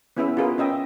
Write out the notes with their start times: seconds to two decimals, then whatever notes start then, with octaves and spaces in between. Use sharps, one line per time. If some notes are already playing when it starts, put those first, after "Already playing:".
0.17 B3 C#4 E4 G#4 B4 E5
0.37 F4 F#4 G#4 A#4 B4
0.58 C#4 D#5 E5 G5